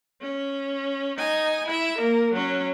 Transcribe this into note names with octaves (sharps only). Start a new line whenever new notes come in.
C#4
D#4 G#5
E4 E5
A#3 A#4
F#3 C#4